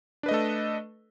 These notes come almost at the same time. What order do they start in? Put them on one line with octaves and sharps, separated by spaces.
D4 B4 D#5 A3 A4